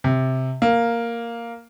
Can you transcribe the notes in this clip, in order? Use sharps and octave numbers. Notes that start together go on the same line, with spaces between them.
C3
A#3